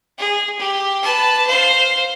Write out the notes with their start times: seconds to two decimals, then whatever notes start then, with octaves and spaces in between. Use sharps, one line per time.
0.19 G#4
0.59 G4
1.03 B4 A5
1.47 C5 F5